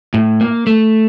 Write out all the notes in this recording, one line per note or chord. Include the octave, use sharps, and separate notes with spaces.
A2
A#3
A3